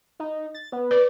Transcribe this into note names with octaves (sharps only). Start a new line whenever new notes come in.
D#4
A6
B3
B4 D5